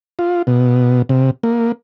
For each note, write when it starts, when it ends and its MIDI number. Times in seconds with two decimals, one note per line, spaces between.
0.19 0.42 65
0.47 1.02 47
1.09 1.31 48
1.43 1.72 58